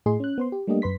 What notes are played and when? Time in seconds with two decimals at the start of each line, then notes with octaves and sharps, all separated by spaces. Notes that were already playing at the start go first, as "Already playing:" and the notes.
0.06 A2 G#4 D#5 C6
0.20 C#4 F#6
0.38 B3 C5 C6
0.52 G4
0.67 G3 A3 A#3 D4 G4 D#5
0.82 F#2 B4 C6 B6